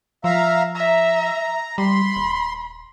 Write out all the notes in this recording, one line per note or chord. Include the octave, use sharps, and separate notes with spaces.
F3 E5 F5 A#5
E5 A#5
G3 B5 C6
D#1